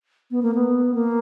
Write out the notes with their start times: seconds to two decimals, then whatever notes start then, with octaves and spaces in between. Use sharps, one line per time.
0.31 B3
0.43 A#3
0.55 B3
0.95 A#3